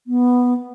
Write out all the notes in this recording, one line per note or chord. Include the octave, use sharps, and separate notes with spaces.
B3